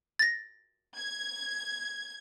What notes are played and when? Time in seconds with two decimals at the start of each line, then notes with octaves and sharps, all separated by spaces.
0.19 A6 A#6
0.97 G#6